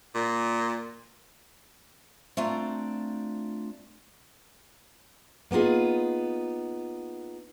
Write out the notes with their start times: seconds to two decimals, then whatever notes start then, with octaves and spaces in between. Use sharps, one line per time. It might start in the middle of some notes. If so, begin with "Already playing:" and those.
0.15 A#2
2.37 A3 C4 D4 F4 A#5
5.51 A#3 B3 D#4 F4 G#4